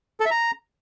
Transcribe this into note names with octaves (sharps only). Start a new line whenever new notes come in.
A4
E5
A#5